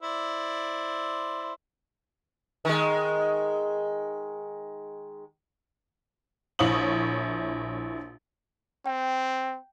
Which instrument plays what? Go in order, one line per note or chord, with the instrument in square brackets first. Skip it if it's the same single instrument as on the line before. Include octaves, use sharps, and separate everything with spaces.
[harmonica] E4 C5 D5
[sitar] D#3 G#3
[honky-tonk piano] A#1 E4 C#5 D#6 F#7
[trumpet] C4 [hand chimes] G5